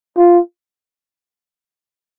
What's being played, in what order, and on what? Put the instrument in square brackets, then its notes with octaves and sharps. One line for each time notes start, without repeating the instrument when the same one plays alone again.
[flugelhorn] F4